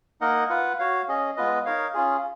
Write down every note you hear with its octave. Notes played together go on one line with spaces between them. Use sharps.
A#3 D#4 A#4 D#5 F#5
F4 B4 F#5
F#4 C#5 F5
C#4 G#4 D#5
G#3 B3 F4 B4 D#5
D#4 A#4 C#5 F5
C#4 F4 G#4